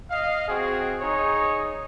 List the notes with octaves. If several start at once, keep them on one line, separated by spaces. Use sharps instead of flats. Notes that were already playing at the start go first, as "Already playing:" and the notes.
D#5 F5
C4 F#4 G#4
D#4 G#4 C#5